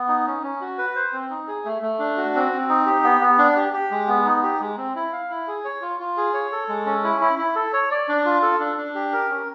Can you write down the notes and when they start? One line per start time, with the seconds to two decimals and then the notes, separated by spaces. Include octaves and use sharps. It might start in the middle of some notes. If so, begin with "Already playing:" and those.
Already playing: B3
0.08 D#4
0.27 C#4
0.43 C#4
0.61 F#4
0.78 B4
0.96 C5
1.13 C4
1.30 D#4
1.47 G#4
1.65 A3
1.82 A3
1.99 D4
2.17 F#4
2.35 C4
2.52 C4
2.69 D#4
2.86 G4
3.04 B3
3.21 B3
3.38 D4
3.56 G4
3.73 G4
3.91 G#3
4.08 B3
4.25 D#4
4.43 G4
4.60 G#3
4.78 C4
4.95 E4
5.13 F5
5.30 E4
5.48 G#4
5.64 C#5
5.82 F4
6.00 F4
6.17 G#4
6.34 C#5
6.52 A4
6.69 G#3
6.86 C#4
7.04 E4
7.21 E4
7.39 E4
7.56 A4
7.73 C#5
7.91 D5
8.09 D4
8.25 F4
8.43 A4
8.60 D4
8.78 D4
8.95 G4
9.13 A#4
9.29 C#4